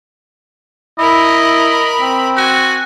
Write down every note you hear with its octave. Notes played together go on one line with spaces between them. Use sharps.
E4 A#4 D#5 B5
C4
F#4 G#5